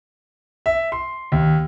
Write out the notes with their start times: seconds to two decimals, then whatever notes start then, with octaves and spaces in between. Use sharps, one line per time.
0.66 E5
0.92 C6
1.32 D#2